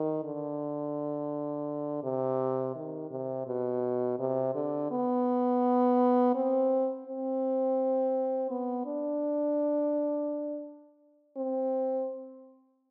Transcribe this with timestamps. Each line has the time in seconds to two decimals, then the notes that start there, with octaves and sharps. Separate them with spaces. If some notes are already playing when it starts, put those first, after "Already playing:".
Already playing: D#3
0.24 D3
2.04 C3
2.76 D#3
3.11 C3
3.47 B2
4.19 C3
4.55 D3
4.91 B3
6.35 C4
7.07 C4
8.51 B3
8.86 D4
11.37 C4